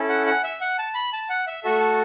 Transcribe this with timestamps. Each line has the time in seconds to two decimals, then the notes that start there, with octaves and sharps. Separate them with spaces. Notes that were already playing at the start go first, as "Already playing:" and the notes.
Already playing: C#4 E4 A4
0.09 F#5
0.26 F#5
0.44 E5
0.61 F#5
0.78 A5
0.95 B5
1.13 A5
1.30 F#5
1.47 E5
1.64 A3 F#4 A4 E5
1.80 A5